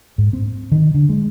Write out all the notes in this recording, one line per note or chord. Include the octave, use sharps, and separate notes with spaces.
G#2
C4
D#3
D3
G#3